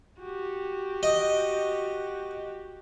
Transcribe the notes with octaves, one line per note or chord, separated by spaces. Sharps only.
F#4 G4
D#5